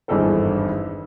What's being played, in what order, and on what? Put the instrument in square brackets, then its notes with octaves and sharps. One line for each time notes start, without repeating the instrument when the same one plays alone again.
[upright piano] G#1 E2 G2 G#4 A4 C5